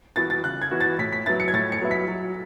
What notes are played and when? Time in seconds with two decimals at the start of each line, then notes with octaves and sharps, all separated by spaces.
0.16 E3 B3 F#4 A6
0.30 A6
0.44 C#3 F#6
0.62 G#6
0.71 E3 B3 F#4
0.80 A6
0.99 A2 B6
1.13 B6
1.26 F#3 B3 E4 A6
1.40 C#7
1.48 G#6
1.53 A2 A6
1.72 C#7
1.82 F#3 B3 E4
1.91 B6
2.08 F#3